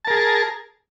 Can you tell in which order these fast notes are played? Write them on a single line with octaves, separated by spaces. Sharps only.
A5 A#4 G#4